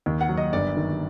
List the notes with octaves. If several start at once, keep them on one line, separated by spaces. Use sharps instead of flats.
D#2
F#5
F#3
D#5
G1 D5
D#3